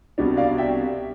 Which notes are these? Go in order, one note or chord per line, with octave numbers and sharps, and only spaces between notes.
C2 B2 G3 D4
D5 F5
E5 G5